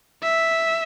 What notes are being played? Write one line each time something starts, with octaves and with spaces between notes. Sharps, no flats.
E5